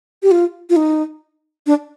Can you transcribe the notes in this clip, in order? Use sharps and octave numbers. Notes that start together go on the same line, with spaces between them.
G4
F4
F4
D#4
D4